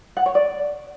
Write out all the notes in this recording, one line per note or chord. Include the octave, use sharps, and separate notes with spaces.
F#5
C#5
D5